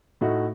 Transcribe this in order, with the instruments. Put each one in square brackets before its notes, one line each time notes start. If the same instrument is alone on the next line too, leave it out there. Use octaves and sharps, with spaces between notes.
[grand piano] A2 A3 D#4 F#4